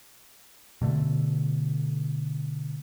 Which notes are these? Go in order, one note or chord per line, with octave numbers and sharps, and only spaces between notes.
B2 D3 A3